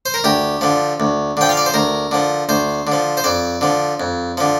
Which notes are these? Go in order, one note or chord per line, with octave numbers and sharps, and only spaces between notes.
C5
A#4
D2 G4
D3 F3
D2
D3 F3 G5
F5
D5
C5
D2 A#4
D3 F3
D2 C5
D3 F3
C5
F2 D5
D3 F3
F2
D3 F3